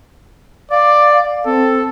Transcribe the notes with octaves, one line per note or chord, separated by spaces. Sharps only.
D5 F5
C4 A4